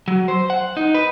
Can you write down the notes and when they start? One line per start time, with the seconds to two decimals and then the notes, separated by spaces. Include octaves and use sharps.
0.08 F#3
0.28 C5
0.50 F#5
0.77 D#4
0.94 B4